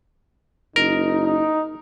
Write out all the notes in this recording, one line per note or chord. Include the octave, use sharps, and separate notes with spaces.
F#1 D#4 A#4
D#4